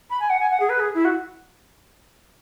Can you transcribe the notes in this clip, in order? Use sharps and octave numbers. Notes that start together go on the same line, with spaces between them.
B5
G#5
F#5
G#5
F#5
G#4
B4
G#4
E4
F#4